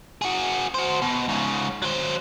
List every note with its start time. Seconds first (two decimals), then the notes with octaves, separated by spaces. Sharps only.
0.22 F#4 G#4
0.74 F#4 C5
1.02 B2
1.29 G#2 C#3
1.82 F#3 C5